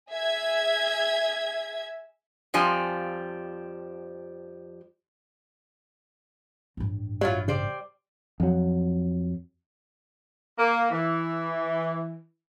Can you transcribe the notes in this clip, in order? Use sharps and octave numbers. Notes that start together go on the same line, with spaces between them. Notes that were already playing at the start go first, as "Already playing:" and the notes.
G#4 E5 G#6
F2 F3 G3 G#5
A1 G2
F#3 G3 E4 F4
C#3 G3 C5 D5
F2 F#3
A#3
E3